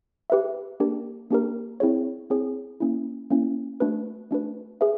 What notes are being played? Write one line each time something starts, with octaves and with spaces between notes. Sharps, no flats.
G4 B4 E5
A#3 D4 G4 A#4
A#3 D4 G4 A#4
C4 E4 G#4 C#5
C4 E4 G#4 C#5
A#3 C#4 E4
A#3 C#4 E4
A3 D4 F#4 B4
A3 D4 F#4 B4
G#4 B4 E5